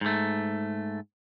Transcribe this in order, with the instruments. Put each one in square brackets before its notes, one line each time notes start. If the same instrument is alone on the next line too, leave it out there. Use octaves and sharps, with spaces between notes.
[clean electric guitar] G#2 A3